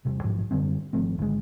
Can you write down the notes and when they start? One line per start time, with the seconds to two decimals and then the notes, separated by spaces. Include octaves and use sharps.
0.05 E1 C3 G3
0.24 A1 G#2 F3 F#3
0.51 F#2 D3 G3 C4
0.93 G#1 F3 A3 C4
1.18 G#1 D3 D#3 G#3